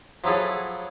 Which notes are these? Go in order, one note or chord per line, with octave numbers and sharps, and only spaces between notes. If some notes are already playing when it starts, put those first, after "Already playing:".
F3 F#3 E4 G#4 A4